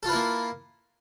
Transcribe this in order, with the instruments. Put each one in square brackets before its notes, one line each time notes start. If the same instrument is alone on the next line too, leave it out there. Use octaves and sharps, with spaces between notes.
[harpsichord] A4
F4
B4
E4
A#3